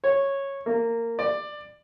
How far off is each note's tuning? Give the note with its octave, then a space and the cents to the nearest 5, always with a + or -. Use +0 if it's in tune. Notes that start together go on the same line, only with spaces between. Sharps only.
C#5 -10
A#3 -15
D5 +15